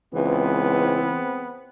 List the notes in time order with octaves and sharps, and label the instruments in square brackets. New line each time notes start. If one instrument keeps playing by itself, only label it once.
[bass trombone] C#2 [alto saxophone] E3 [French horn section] G#3 C4 [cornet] B3